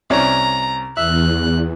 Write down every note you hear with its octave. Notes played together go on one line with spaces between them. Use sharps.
C2 C#4 D5 A#5
E2 E5 F#6